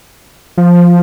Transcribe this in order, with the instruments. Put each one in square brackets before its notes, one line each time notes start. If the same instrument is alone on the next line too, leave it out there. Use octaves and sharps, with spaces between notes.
[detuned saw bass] F3